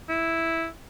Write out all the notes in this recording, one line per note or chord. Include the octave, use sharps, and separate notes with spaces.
E4